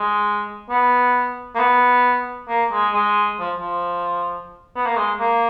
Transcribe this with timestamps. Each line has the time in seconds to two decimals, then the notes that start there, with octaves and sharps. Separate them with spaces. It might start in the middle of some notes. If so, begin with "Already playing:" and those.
Already playing: G#3
0.70 B3
1.55 A#3
1.60 B3
2.49 A#3
2.72 G#3
2.94 G#3
3.40 F3
3.60 F3
4.76 B3
4.86 A#3
4.97 G#3
5.19 A#3